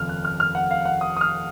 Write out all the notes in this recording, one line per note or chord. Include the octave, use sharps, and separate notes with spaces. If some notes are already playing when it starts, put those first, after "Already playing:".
Already playing: F1 D#2 C#3 F6
F#6
F6
F6
F#5
F5
F#5
D#6
D#6
F6